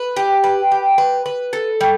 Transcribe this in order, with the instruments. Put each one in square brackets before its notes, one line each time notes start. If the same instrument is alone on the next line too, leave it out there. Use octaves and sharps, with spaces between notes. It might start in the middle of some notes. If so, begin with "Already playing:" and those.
Already playing: [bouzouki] B4
G4
B4
G4
B4
B4
A4
G3